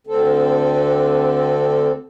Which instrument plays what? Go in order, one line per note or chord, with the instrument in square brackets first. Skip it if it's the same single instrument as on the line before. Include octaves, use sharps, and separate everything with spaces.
[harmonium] D2 D3 C4 A4